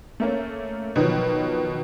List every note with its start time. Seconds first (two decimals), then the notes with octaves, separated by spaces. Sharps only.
0.20 A3 A#3 C#4
0.96 B2 D#3 F3 F#3